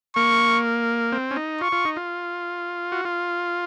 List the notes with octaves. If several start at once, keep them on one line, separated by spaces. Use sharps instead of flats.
A#3 C#6
C4
C#4
D#4
F4 C#6
F4
D#4
F4
F#4
F4